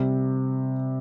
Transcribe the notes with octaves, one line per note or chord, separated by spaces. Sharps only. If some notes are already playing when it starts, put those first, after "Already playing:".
Already playing: C3 G3